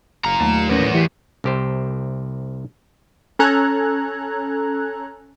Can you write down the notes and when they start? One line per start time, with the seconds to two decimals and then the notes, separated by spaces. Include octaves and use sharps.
0.25 F#1 F4 A#5
0.40 D#2 F#3 A3 E7
0.69 E2 A2 B3 C#4 A#4 A#6
0.94 E3 G4 B6 C7
1.44 C2 G4 C5
3.39 C#4 A4 A#5 F#6 G#6